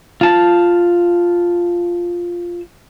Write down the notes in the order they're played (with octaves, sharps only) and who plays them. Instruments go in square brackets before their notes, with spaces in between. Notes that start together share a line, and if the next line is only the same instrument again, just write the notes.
[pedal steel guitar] F4 A5